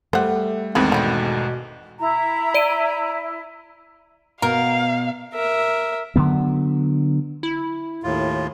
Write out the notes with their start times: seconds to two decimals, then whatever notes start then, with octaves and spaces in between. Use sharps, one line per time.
0.13 G3 A3 C5 F#5
0.75 G#1 E2 G#2 C4 G#4 A#4 B5
0.92 B2 D3 G3 C4
1.99 E4 A#5
2.54 D5 D7 D#7
4.42 B2 A#4 F5
5.34 A#4 E5
6.16 D3 F#3 B3
7.43 E4
8.03 D#2 A2 F4